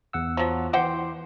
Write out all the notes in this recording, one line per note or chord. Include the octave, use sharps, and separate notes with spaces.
E2 F#5 E6
F3 F#3
E3 C5 F#5 G5 C6 D6